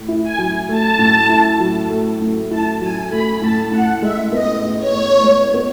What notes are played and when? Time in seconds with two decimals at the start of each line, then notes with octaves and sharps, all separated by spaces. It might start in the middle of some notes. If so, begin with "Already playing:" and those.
Already playing: A2
0.08 E4
0.23 G#5
0.38 F#3
0.69 A3 A5
0.99 A2
1.29 E4
1.60 F#3
1.90 A3
2.20 A2
2.51 E4 A5
2.81 F#3 G#5
3.11 A3 B5
3.42 A2 A5
3.72 A2 F#5
4.02 G#3 E5
4.32 B3 D#5
4.63 A2
4.78 C#5
4.93 A2
5.23 G#3
5.54 B3